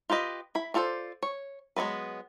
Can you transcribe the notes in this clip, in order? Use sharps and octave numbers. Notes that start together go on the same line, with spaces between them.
F4 G4 B4 D#5
E4 B5
D4 F4 A4 C5 D5
C#5
F#3 G#3 B3 C4 B4